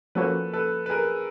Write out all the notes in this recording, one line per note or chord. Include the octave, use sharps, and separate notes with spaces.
F3 A#3 C#4 F#4 A4 B4
A4 B4
B4
G#4 A#4